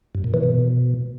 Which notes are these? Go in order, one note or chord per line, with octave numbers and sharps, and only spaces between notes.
G2
A#2
E3
B2